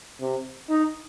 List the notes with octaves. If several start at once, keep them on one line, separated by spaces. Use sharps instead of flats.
C3
D#4